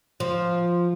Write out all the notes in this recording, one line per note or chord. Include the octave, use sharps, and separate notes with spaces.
F3